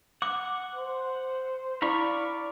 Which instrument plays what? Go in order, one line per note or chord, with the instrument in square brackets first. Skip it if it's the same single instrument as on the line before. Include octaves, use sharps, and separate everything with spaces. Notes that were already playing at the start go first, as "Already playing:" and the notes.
[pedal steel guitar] F#5 [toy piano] D6
[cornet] C5
[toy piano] E4 [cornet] D5 [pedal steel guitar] F5 B5 C#6